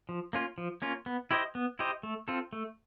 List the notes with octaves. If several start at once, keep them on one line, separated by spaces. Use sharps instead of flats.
F3
A#3 C#4 F4
F3
A#3 C#4 F4
B3
E4 G4 C5 D#5
B3
E4 G4 C5 D#5
A3
C4 F4 A4
A3